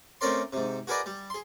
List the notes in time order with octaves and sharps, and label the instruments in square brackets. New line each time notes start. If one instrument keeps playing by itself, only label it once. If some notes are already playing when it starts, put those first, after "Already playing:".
[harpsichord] A3 C4 C#4 A#4 D5 C6
G#2 C3
F#4 G#4 A#4 B4 D5 D#5
G3
G#4 C6